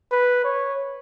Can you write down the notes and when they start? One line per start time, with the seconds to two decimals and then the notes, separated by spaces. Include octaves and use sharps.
0.12 B4
0.44 C#5